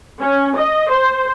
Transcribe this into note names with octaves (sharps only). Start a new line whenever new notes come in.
C#4
D#5
C5